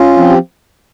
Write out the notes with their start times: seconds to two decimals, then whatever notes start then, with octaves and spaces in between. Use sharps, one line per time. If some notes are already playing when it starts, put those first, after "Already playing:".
Already playing: C#4 F4
0.17 F3 C4
0.30 G4